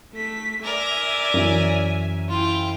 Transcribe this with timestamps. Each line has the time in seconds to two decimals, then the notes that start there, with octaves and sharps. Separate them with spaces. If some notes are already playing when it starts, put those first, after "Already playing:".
0.14 A3 B6
0.64 A#4 D5 E5 G#5
1.34 F#2 E3 C#4
2.29 E4 F4 G5